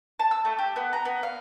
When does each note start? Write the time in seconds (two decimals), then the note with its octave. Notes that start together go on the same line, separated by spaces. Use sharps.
0.19 A5
0.31 E6
0.45 A3
0.59 G4
0.76 B3
0.93 A#5
1.05 B3
1.23 F5